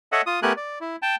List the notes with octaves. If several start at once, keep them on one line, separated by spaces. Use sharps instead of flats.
A4 C#5 D#5 E5 F#5
F4 D#6
A3 B3 G4 A#4 G#5 F#6
D5
E4
G5 A5